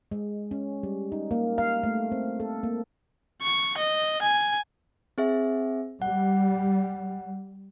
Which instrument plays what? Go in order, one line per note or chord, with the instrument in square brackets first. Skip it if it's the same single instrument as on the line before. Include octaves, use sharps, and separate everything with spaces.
[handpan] G#3
C#4
G3
D#4
A#3
F5
A3
C4
A4
A#3
[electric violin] C#6
D#5
G#5
[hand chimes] C4 G#4 E5
[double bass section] G3 [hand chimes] F#5